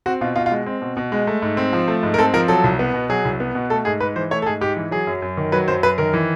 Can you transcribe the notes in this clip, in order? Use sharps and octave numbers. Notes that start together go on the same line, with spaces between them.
C4 F#4
B2 F4
B2 F4
F4
G#3
C4
B2
B2
G#3
A3
G#2
C4
F3
A3
G#2
A#4
C4 A4
F3 A#4
F#3 A4
C2
B3
B2
F#3 G#4
C2
B3
B2
A3 A4
G#2 G#4
G#2 B4
E3 C5
A3 C#5
A4
G#2 G#4
G#2 G4
E3
F#3 G#4
F#2
F#2
D#3
F#3 B4
F#2 C5
F#2 B4
D#3 A#4
E3